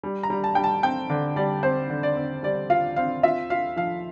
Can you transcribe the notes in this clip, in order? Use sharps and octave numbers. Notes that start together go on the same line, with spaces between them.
G3
A#5
G3
A5
G3 G5
A5
C4 G5
D3
G3 D5
C4 C5
D3
D5
C4
G3 D5
F4 F5
C4 F5
F4 E5
F4 F5
F3 F5